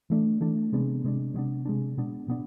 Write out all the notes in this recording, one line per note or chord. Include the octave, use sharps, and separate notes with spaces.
E3 A3 D4
E3 A3 D4
C3 G#3 B3 D4
C3 G#3 B3 D4
C3 G#3 B3 D4
C3 G#3 B3 D4
B2 B3 D4
B2 B3 D4